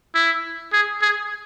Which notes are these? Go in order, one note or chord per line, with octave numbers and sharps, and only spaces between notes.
E4
G#4
G#4